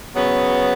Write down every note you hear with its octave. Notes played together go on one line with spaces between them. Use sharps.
C#3 F#3 B3